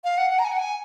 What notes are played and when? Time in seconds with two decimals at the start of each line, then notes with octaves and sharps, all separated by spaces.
0.04 F5
0.18 F#5
0.31 F#5
0.39 A#5
0.45 G#5
0.52 F#5
0.58 G#5